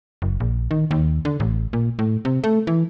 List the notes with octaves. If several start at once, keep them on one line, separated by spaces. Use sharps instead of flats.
F#1
A#1
D#3
D#2
D3
A1
A#2
A2
C3
A3
E3